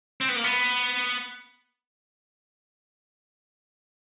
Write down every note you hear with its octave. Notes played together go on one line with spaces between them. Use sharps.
C4
B3
A#3
B3